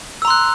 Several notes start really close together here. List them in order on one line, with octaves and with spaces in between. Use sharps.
E6 A#5 C6 F#6